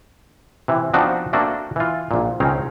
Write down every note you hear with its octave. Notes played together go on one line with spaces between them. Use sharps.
C3 E3
F3 B3 C4 D4 D#4 F#4
A3 A#3 C4 D4 F#4 A4
E3 F4
A#1 A#2
C#2 C4 C#4 D#4 F5